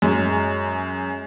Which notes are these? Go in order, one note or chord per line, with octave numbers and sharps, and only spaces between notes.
F#2 G#3